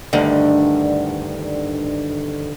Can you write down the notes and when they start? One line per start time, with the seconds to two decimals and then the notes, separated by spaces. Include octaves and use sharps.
0.13 D2 G2 D3 D#3